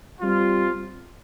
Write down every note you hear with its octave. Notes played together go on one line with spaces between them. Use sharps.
G3 C4 F4